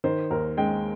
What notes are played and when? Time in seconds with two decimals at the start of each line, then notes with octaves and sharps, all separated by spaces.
0.04 D#3 C5
0.30 D#2 A#4
0.57 G#3 G5